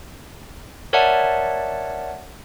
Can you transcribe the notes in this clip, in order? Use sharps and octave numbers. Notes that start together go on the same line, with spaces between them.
A#4 C#5 D5 E5 F#5 A5